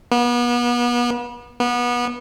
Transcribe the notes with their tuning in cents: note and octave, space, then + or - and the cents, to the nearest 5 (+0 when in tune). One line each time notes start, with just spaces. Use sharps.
B3 -35
B3 -25